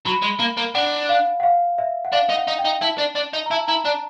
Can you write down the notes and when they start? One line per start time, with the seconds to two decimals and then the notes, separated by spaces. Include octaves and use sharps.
0.06 F#3 B5
0.22 G#3
0.40 A#3
0.57 A#3
0.75 D4 F#5
1.09 F5
1.40 F#5
1.43 F5
1.78 E5
2.05 F#5
2.13 D4 F5
2.30 D#4
2.36 F#5
2.48 D#4
2.59 G5
2.65 D#4
2.82 E4 A5
2.99 D4
3.16 D4
3.33 D#4
3.46 A#5
3.51 E4 A5
3.68 E4 A#5
3.85 D4 A5